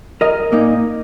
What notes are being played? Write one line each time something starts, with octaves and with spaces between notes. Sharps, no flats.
A#4 D#5
A#2 A#3 D#4